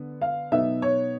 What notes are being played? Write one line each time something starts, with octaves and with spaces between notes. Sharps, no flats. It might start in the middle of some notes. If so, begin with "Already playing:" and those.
Already playing: D3 B3
F5
B2 F#3 B3 D#4 E5
C#5